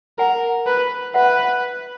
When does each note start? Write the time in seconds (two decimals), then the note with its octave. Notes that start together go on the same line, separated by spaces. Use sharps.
0.19 A#4 F#5 G#5
0.66 B4
1.14 B4 E5 F#5